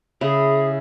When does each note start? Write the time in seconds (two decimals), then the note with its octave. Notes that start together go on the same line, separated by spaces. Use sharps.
0.21 C#3 E4 G#4